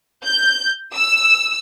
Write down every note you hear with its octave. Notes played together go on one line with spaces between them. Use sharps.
G6
E6